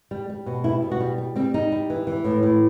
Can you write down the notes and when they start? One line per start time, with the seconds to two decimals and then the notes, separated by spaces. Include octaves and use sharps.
0.11 G3
0.29 G3
0.46 B2
0.64 G3 E4
0.82 B2
0.91 F#4
1.00 G3
1.18 G3
1.36 G3 C4
1.54 G3 D#4
1.72 G3
1.90 E3
2.07 E3
2.24 A2
2.43 A2